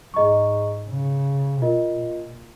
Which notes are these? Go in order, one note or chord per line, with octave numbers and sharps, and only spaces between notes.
G#2 G#4 D#5 A#5 C#6
C#3
A#2 F4 A#4 D#5
A#2